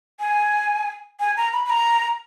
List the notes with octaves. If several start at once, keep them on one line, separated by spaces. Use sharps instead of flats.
G#5
G#5
A#5
B5
B5
A#5